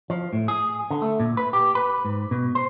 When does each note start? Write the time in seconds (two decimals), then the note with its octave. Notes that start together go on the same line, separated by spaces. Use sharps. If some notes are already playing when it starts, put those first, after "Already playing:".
0.10 F3
0.33 A2
0.48 G#4
0.90 D3
1.02 A3
1.20 A#2
1.37 B4
1.53 G4
1.75 B4
2.05 G#2
2.31 B2
2.55 C5